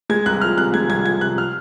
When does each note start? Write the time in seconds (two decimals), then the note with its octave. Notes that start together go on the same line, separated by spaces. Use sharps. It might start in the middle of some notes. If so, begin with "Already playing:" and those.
0.09 G#3 G#6
0.26 C2 F#6
0.41 F3 F6
0.58 C3 F#6
0.74 G#3 G#6
0.89 C2 G#6
1.05 F3 G#6
1.21 C3 F#6
1.38 F6